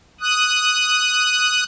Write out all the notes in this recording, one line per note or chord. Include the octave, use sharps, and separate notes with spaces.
D#6 F#6